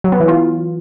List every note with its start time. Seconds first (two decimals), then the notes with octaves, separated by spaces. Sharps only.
0.04 F#3
0.12 B3
0.20 E3
0.28 F4